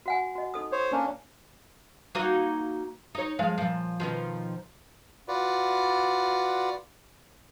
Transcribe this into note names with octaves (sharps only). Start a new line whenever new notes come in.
F#4 F#5 G#5
F#4 D#5
D#4 A4 D#6
C5 C#5
A#3 C#4 D4
A#3 D#4 F#4
D#4 C#5
F3 G#3 F5
A#2 F3
B2 D#3 F3
F4 F#4 B4 D5